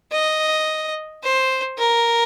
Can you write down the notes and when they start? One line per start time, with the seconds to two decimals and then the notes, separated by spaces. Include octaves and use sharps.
0.12 D#5
1.23 C5
1.78 A#4